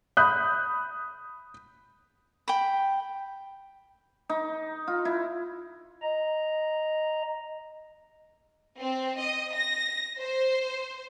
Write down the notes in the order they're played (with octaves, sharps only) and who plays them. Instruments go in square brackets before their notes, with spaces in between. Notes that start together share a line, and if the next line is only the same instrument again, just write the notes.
[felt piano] B5 D#6 F#6 G6
[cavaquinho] G5 B5
[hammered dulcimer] D#4
F4
E4
[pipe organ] D#5 A#5
[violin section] C4
D#5
A#6
C5